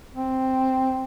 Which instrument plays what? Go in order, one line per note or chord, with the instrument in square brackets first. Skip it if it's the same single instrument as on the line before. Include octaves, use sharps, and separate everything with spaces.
[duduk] C4